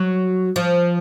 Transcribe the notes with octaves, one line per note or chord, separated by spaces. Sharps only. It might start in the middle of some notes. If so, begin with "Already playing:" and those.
Already playing: F#3
F3